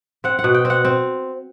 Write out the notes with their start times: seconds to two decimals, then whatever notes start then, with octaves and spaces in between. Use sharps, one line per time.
0.24 C4 F#5
0.39 F#5
0.44 B2
0.54 G5
0.65 C4
0.70 F#5
0.85 C4